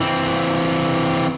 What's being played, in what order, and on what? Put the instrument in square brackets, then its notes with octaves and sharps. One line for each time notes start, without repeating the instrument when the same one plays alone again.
[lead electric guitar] E3 C4